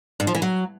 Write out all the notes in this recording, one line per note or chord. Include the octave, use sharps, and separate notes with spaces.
G2
F3
E3
F#3